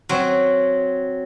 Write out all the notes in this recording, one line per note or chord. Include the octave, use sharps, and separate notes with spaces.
F#3 C4